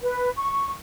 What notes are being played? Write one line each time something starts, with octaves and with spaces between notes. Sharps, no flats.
B4
C#6